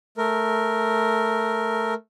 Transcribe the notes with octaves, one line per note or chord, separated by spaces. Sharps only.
A3 A#4